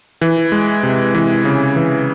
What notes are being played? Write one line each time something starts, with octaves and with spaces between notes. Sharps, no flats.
E3
G#3
C3
E3
C#3
E3